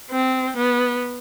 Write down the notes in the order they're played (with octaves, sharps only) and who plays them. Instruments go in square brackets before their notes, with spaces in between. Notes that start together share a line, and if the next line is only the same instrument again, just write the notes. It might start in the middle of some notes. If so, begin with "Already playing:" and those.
[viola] C4
B3